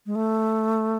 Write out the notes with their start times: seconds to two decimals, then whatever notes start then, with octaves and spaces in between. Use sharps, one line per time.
0.06 G#3
0.15 A3